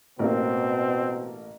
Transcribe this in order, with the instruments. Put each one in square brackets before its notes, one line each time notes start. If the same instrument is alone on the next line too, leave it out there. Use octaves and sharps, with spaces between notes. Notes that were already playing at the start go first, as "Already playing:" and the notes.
[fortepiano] A1 A#3 [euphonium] B2 [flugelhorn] C4